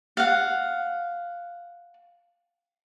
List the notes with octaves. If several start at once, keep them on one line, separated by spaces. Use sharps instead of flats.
F5 F#5